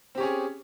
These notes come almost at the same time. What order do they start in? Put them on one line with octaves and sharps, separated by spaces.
C4 G4 C#4 G#4